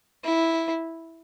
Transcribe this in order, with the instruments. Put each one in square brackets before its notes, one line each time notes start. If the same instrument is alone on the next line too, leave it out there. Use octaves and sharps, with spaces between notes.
[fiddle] E4